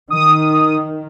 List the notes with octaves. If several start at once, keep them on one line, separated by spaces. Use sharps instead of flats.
D#3 D#6